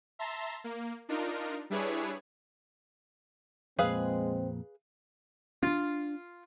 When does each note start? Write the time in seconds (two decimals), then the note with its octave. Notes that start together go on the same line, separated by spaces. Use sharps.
0.19 E5 A5 A#5 C6
0.64 A#3
1.09 D4 D#4 F4 A#4
1.70 G3 D4 E4 G#4 B4 C#5
3.79 F2 A#2 G#3 C4 G#4 B4 F5
5.63 C#4 D4 F4